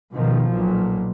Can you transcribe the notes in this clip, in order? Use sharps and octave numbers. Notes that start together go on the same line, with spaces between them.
B2 D#3 F3
B1 A#2